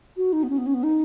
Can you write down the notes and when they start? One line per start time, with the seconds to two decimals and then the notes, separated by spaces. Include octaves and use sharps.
0.17 F#4
0.33 D#4
0.43 B3
0.50 C#4
0.58 B3
0.66 C#4
0.74 B3
0.83 D#4